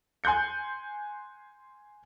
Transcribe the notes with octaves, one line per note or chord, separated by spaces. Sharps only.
G#5 C6 F#6 G6 C#7